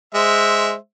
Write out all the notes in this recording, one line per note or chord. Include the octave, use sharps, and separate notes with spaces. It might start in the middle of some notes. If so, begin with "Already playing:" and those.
G#3 C5 E5